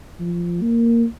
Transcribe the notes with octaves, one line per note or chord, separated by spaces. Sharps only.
F3
A#3